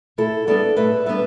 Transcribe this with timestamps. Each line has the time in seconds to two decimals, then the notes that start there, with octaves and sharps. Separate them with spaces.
0.18 A2 E4 A4
0.47 G3 B3 D4 A4 D5
0.76 A2 B4 E5
1.06 G3 B3 D4 B4 E5